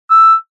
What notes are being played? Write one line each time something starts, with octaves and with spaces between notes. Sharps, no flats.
E6